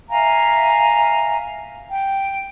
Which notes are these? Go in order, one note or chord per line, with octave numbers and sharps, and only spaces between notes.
E5 F5 G#5 A#5
G5